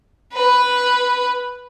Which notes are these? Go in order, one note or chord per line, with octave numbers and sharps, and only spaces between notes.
B4